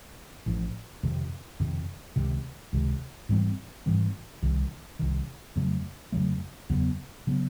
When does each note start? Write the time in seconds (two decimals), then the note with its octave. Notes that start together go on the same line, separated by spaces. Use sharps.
0.46 A1 A2 F3
1.03 F2 C3 D#3
1.60 F2 C3 D#3
2.16 C#2 C3 D#3
2.73 C#2 C3 D#3
3.29 G#2 E3 G3 C4
3.86 G#2 E3 G3 C4
4.42 C2 C3 D#3
4.99 C2 C3 D#3
5.56 F2 C#3 F#3 A3
6.12 F2 C#3 F#3 A3
6.70 E2 C#3 F#3 B3
7.27 C#3 F#3 B3